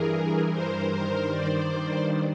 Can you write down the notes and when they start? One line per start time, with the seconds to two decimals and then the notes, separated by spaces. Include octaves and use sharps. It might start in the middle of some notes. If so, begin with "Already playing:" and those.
Already playing: G2 E3 G#4 A#4
0.52 A#4 C5
0.91 G2 D#3 A#4 C5
1.30 C5 D5